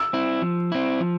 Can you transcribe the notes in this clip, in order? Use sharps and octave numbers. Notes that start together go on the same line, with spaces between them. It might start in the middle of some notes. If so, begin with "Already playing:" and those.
Already playing: E6
C4 E4
F3
C4 E4
F3